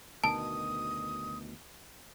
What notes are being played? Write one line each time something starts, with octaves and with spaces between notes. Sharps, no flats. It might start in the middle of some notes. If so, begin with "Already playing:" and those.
D2 B2 D#3 A5 D#6